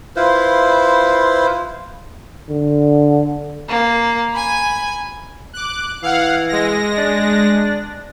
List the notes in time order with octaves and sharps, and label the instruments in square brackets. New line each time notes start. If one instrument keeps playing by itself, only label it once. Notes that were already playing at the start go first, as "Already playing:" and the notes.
[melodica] E4 F4 B4 C5
[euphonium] D3
[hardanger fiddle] A#3
G#5 B5
[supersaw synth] D6 F#6
[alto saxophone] E3 [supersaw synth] F5 F#5
[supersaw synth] G#3 A#6
[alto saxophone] D4